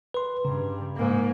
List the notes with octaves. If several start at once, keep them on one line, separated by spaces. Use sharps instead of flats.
B4 C6
G2 C#3
G#2 A#3